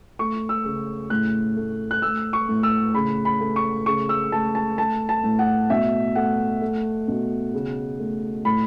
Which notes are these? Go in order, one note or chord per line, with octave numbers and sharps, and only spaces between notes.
A3 C#6
E6
C#3
A2 F#6
A3
F#6
A3 E6
C#6
A2
E6
C#3 B5
B5
A3
C#6
C#3 C#6
E6
A3 A5
A5
A3 A5
A5
A2
F#5
B2 E5
A3 F#5
A3
B2
C#3
A3
A2 B5